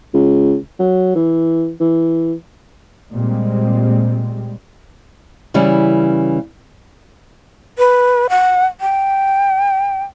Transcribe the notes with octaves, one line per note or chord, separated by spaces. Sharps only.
C#2
F#3
E3
E3
A#2 G3 G#3 C4
C#3 E3 G3 C#4
B4
F#5
G5